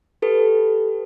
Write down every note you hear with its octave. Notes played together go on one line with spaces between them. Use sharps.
G4 A4 B4